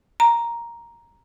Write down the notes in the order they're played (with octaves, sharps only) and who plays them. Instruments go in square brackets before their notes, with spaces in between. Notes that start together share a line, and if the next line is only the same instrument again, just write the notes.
[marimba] A#5